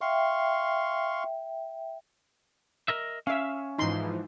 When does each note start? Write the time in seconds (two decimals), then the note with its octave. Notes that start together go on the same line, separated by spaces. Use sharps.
0.01 E5 F5 G5 C6 C#6
2.88 A#4 D#5 E5
3.27 C#4 E5 F5
3.79 G#2 E3 F3 D#4 C6